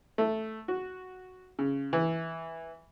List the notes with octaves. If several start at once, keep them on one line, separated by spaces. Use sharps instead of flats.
A3
F#4
C#3
E3